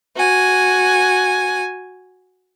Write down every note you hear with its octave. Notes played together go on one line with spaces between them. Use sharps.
F#4 G#5